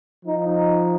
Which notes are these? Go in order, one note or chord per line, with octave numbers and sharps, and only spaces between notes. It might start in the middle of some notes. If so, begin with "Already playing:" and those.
F3 D#4